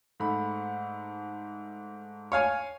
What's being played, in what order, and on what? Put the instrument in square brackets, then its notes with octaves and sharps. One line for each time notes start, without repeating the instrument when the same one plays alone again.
[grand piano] G#2 A3 B5
[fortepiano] C#5 F5 G#5